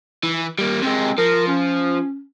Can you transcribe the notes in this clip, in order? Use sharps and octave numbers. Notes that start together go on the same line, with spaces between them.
E3
G3 A#3
C3 G#3 C4
F3 A#4
C#4